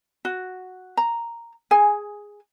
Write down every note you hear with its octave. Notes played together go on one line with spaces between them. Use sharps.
F#4
A#5
G#4 G#5